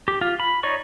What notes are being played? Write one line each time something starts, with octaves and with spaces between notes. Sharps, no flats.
G4
F4
B5
D#4 C#5 D5 C#6